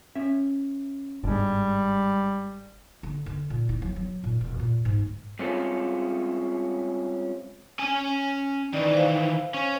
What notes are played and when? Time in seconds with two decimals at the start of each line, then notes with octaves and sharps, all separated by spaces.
0.15 C#4 E5
1.24 G1 G#2 G3 G#3 D4
3.03 D3
3.26 D3
3.50 A#2
3.69 E4
3.82 F#3
3.96 F#3
4.24 A#2
4.41 E1
4.59 A#2
4.85 G#2
4.99 D2
5.39 G3 G#3 C4 C#4 F4 A4
7.79 C#4 G#5
8.73 D#3 E3 D5
8.94 C5 F5
9.54 C#4